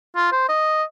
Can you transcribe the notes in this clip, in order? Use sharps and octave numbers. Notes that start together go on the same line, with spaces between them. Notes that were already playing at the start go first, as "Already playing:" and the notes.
F4
C5
D#5